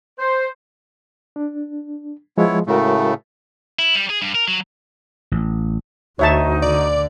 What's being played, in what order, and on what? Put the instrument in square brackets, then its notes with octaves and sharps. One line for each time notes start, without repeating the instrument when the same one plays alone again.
[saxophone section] C5
[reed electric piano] D4
[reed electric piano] F3 G#3 [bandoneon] B3 E4 C#5
[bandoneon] A2 C#3 A3 [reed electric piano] G#3 F#4 A#4
[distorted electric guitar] E4
G3
G#4
G2
A#4
F#3
[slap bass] A1
[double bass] D2 [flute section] D#4 F#4 [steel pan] C#5 E5 A5
[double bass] D3 [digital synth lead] D5